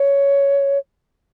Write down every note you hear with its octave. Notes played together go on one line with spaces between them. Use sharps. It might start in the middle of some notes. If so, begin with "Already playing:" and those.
Already playing: C#5